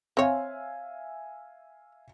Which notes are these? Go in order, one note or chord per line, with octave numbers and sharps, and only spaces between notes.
C4 C#5 E5 F5 G#5